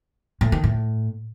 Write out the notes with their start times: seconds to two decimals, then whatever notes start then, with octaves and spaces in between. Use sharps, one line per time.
0.41 A2
0.52 D#3
0.64 A2